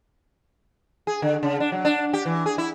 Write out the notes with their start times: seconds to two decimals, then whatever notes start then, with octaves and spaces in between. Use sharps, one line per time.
1.07 G#4
1.22 D3
1.43 C#3
1.60 D4
1.72 F#3
1.85 D4
2.13 G4
2.26 E3
2.46 G#4
2.58 E4